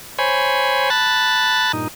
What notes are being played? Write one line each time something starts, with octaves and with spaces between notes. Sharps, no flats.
C5 C#5 G#5 B5
A5 B5 F#6 A6
G2 A#2 D#4